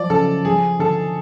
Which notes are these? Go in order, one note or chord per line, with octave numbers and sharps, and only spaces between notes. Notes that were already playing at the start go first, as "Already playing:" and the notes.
Already playing: F3 F#3 D5
C#3 A4
F3 G#4
D3 A4